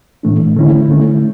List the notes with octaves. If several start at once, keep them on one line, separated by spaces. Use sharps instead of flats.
A2 E3 A3 D4
D3 A3 C#4 E4
D3 A3 C#4 E4